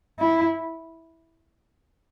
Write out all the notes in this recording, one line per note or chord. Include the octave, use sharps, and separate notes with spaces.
E4